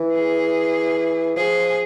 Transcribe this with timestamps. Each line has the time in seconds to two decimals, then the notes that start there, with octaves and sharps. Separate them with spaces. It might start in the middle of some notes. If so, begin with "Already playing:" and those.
Already playing: E3
0.13 G#4
1.36 F3 G#4